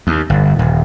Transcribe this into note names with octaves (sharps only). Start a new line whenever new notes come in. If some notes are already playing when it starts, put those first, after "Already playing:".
D#2
G1
D#1